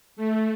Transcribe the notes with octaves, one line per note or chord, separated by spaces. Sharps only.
A3